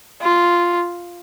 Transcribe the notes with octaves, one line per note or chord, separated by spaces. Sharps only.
F4